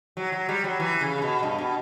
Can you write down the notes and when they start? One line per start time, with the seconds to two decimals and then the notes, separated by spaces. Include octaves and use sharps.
0.17 F#3
0.32 F#3
0.49 G3
0.64 F#3
0.80 E3
1.01 C#3
1.22 B2
1.43 G2
1.58 B2